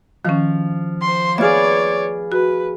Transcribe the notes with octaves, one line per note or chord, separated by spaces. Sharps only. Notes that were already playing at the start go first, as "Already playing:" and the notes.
D#3 F3 C#4
C5 C6
B3 F4 G#4 C#5 D5 E5 F6
F#4 B4